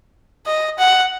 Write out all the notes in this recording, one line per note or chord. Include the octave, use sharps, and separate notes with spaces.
D#5
F#5